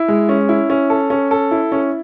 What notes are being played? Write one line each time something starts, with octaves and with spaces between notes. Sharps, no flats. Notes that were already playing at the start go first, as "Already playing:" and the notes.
Already playing: E4
G#3
C#4
E4
C#4
A4
C#4
A4
E4
C#4